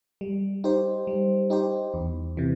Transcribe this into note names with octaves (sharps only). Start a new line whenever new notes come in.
G3
D#4 G4 C5
G3
D#4 G4 C5
E2
C3 E3